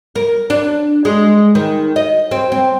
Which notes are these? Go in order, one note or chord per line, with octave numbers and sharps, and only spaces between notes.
A#4
D4
G#3
D#3
D#5
C4
C4